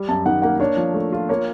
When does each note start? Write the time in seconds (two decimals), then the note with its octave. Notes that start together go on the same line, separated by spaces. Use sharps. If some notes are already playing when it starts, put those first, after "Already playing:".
Already playing: G3
0.09 F#2 A5
0.26 D#3 F#5
0.42 A#3 F#5
0.60 D4 C#5
0.77 F3
0.94 A3
1.12 F4
1.29 A#3 C#5